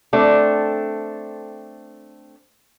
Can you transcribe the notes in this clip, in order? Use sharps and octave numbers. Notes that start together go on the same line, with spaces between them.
A3 C4 D4